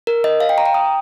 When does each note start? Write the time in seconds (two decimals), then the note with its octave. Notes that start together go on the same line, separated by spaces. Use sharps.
0.07 A#4
0.24 D#5
0.40 F5
0.49 G5
0.58 A#5
0.66 G5
0.74 D#6